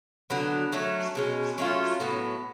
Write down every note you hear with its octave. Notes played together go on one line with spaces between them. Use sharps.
D3 F#3 B3
F#3 A3 C#4
B2 G#3 C#4
F#3 A3 C#4 F4
A2 F#3 B3